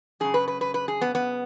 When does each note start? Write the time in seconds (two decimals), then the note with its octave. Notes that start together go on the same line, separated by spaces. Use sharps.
0.20 F#2 C#3 G#4
0.34 B4
0.48 B4
0.61 B4
0.74 B4
0.88 G#4
1.01 B3
1.15 B3